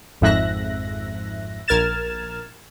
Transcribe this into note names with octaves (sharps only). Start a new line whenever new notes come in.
G#1 F2 G#2 E5 F#6 A#6
A#1 A#4 F6 G#6 A6 E7